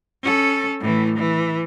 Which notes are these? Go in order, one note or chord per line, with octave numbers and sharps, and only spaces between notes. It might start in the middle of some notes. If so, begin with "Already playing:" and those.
C#4 A4
A2 E3
E3